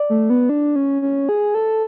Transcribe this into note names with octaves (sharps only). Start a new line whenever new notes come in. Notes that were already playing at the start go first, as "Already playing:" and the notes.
Already playing: D5
A3
B3
D4
C#4
C#4
G#4
A4